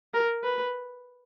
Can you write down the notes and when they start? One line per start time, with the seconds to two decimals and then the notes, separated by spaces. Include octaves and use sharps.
0.14 A#4
0.43 B4